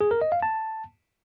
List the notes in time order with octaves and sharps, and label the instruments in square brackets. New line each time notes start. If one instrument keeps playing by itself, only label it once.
[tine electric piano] G#4
A#4
D#5
F5
A5